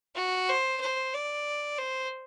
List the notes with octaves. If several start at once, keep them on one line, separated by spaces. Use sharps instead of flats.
F#4
C5
C5
D5
C5